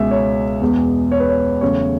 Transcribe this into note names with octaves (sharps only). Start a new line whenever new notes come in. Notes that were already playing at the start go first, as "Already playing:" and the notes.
Already playing: C#2 B2 G#3 E5
C#5
E2 B2 G#3
C#5
B4
C#5
E2 C#3 F#3 A3 C#5